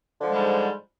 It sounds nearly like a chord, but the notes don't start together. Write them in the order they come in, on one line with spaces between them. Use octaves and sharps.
D3 F3 G#3 G3 G#2